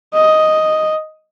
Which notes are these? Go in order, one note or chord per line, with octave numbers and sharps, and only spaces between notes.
D#5